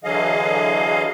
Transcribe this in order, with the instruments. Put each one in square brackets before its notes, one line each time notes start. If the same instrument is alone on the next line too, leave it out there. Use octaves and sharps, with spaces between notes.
[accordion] D3 E3 F#3 G#4 D#5 F5